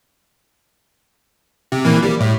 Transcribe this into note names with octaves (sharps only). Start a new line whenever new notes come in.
C3
A#1 E3 A#3
G3
A2